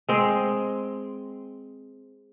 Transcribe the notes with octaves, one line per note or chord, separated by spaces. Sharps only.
G#3 C4